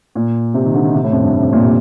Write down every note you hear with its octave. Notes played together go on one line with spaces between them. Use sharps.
A#2
C3
D#3
D3
D#3
C3
A2
F2
G2
A2
C3
A#2
C3